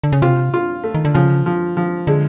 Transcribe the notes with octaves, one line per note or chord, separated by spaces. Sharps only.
D3
C#3
C3 F4
F4
A3
D#3
D3
C#3 F3
F3
F3
D3 G#3